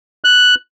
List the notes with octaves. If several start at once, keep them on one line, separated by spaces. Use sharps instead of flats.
F#6